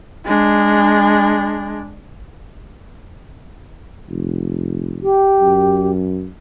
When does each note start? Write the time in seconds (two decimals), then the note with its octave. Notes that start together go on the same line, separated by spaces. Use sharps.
0.25 G#3 D4
4.09 F1
5.02 G4
5.40 F#2